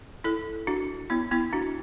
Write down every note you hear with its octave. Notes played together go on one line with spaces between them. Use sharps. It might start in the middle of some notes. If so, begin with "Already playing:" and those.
E4 A4
D4 F#4
B3 E4
B3 E4
D4 F#4